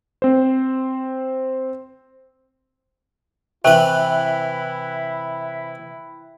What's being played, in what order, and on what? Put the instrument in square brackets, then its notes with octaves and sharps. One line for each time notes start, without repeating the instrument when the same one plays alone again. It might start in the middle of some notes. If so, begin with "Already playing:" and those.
[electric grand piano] C4 C5
[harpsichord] C3 E3 B4 [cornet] E4 [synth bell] E5 G5 F#6